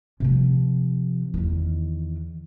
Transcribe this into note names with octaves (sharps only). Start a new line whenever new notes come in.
C3 F3
E2 D#3